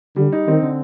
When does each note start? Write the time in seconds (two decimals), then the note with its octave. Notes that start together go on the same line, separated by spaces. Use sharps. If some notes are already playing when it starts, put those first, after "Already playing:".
0.16 D3 G3
0.32 D#4
0.48 D#3 C4
0.62 D3